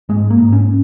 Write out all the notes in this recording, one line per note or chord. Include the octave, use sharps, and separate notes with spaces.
G#2 G#3
A#3
G#2
C#4